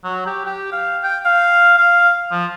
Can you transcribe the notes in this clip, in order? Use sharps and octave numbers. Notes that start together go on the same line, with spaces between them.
F#3
G4
G4
F5
G5
F5
F5
F3